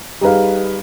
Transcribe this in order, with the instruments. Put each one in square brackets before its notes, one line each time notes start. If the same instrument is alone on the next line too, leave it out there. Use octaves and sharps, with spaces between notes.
[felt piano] G3 D#4 G#4 B4 F5